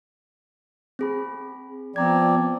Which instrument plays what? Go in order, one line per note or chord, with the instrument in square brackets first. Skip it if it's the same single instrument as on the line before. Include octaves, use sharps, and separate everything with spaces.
[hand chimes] C4 G#4 B5
[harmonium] F3 C4 D5 [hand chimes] B3 A#5 G#6